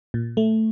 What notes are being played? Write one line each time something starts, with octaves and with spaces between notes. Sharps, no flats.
A#2
A3